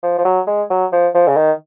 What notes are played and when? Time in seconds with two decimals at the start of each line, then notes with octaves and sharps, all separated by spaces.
0.03 F3
0.18 F3
0.25 F#3
0.47 G#3
0.70 F#3
0.92 F3
1.14 F3
1.27 C#3
1.37 D#3